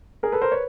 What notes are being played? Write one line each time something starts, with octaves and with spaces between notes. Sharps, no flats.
G#4 A#4
A4 B4
A#4 C5
B4 C#5